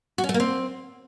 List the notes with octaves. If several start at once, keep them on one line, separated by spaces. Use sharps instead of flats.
F#4
C#4
A3
A#3
C4